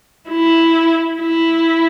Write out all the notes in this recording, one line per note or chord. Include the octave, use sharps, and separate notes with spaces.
E4
E4